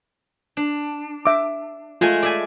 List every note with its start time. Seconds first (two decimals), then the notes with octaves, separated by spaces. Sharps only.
0.57 D4
1.26 E5 D6
2.01 G#3 A3 F4 G#5
2.23 D5 E5 G#5